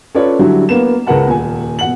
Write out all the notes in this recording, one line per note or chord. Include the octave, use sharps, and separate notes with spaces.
C#4 F4 A4 B4 C#5 D5
D3 F#3 G3 E4 F#4
A#3 B3 E7
C#2 G#3 A#4 B4 F#5 A5
D#1 G#5
E1 F#5 F#7